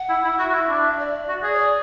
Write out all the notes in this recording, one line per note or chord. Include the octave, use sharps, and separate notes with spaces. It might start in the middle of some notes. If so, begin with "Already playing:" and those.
Already playing: F#5
E4
E4
F#4 E5
F#4
E4
D4
D5
F#4
G#4
C#5
D5